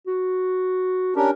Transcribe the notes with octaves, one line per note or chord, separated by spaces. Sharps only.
F#4
C#4 D4 G4 A#4